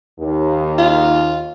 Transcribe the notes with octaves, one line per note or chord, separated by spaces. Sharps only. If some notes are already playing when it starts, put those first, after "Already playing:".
D#2
F4